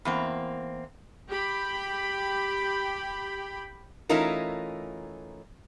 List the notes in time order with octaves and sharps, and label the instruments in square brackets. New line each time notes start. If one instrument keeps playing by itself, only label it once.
[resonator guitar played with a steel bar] E2 A#3 C4
[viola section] G4 G5 B5
[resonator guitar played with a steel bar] E3 A3 C#4 D#4 F4 A#4